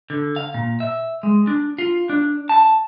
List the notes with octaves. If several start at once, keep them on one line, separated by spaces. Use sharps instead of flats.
D3
F5
A#2
E5
G#3
D4
F4
D4
A5